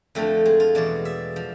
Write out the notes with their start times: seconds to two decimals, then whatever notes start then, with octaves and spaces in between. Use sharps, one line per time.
0.15 F2 D3 F3 A3
0.46 G#3
0.60 F4
0.75 E2 B2 D5
1.05 E5
1.36 F3